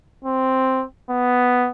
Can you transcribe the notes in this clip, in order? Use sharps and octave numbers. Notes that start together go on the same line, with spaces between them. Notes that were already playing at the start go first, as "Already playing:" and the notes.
C4
B3